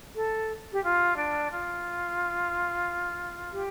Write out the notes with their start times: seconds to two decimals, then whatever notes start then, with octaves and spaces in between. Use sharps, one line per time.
0.16 A4
0.72 G4
0.84 F4
1.18 D4
1.51 F4
3.53 G4